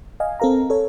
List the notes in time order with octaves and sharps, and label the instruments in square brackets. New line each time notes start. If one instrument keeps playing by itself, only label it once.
[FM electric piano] D#5 F5 G#5
C4 A4 A#4 F5 A#5
A4 C#5